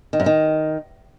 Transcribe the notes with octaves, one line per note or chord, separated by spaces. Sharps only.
D#3
F#2
D#3